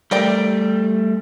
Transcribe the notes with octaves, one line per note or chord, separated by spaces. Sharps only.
G3 A3 A#4 D5 G5